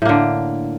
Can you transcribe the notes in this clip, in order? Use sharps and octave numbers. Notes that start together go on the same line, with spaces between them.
A2 D3 A#3